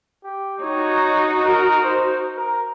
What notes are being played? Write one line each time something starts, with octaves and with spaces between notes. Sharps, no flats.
G4
D#4 F#4 C#5
A#4
C5
A#4